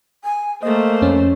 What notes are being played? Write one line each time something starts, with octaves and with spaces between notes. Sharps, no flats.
G#5
A3 A#3 C5 D#5
F2 C#4